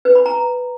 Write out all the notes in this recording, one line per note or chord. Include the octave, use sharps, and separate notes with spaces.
B4
B5
A#5